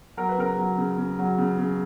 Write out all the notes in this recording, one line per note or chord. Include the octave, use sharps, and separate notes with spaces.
F#3 A#4
B4
C#3 A#4
F#3
C#3
C#3
F#3
C#3
C#3